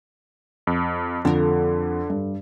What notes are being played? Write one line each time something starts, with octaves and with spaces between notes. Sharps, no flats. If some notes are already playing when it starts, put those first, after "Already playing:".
F2
F2 D3 A4 A#4
G2